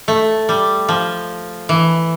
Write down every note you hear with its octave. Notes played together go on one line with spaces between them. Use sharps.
A3
G3
F3
E3